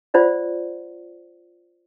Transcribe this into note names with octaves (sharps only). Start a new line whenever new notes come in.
F4 C5 D5 F#5